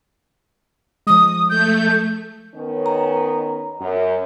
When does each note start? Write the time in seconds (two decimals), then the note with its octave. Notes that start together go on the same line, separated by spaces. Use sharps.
1.07 F3 G#3 D#6
1.49 A3 G6
2.55 D#3 B3 C#4
2.86 A#5
3.80 F#2